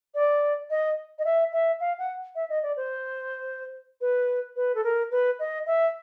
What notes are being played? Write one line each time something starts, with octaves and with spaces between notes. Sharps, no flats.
D5
D#5
D#5
E5
E5
F5
F#5
E5
D#5
D5
C5
B4
B4
A4
A#4
B4
D#5
E5